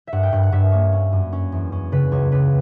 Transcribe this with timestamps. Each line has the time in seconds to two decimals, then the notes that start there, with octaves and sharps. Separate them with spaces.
0.07 E5
0.12 G2 F#5
0.23 G5
0.32 G2 F#5
0.43 F#5
0.52 G2 E5
0.72 A#3 C#5
0.92 C#4
1.12 F#2
1.33 C#4
1.52 E2
1.72 C#4
1.92 C#3 B4
2.12 C#2 C#5
2.32 C#2 B4